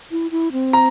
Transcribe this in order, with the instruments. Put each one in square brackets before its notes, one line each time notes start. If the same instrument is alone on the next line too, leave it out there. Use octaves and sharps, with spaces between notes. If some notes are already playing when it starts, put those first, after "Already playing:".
[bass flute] E4
E4
C4
[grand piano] A#5